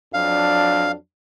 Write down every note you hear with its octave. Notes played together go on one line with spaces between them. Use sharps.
F2 F#3 D4 F5